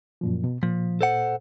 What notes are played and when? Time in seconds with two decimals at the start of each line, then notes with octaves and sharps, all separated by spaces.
0.21 F#2 A#2 F3
0.44 B2
0.63 A#2 F3
1.01 A4 C5 F#5